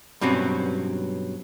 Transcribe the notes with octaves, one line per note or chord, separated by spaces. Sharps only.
G2 B2 F#3 C4 C#4